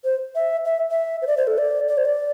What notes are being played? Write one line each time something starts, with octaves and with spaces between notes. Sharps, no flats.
C5
E5
E5
E5
C5
D5
C5
A4
D5
D5
C5
D5